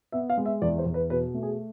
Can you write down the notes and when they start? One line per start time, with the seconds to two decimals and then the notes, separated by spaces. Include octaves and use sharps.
0.12 B3 E5
0.30 F5
0.38 G#3
0.46 E5
0.62 E2 D5
0.78 C5
0.86 E2
0.94 B4
1.10 B2 B4
1.34 A3
1.43 G#4